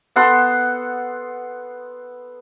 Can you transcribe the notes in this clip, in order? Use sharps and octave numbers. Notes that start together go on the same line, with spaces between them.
B3 A4 F#5 C6